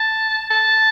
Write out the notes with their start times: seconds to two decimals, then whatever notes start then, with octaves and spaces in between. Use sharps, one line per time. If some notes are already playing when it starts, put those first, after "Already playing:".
Already playing: A5
0.50 A5